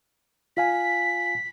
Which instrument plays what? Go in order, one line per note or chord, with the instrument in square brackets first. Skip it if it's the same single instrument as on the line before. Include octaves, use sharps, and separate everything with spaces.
[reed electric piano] F4 F5 G#5 [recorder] B6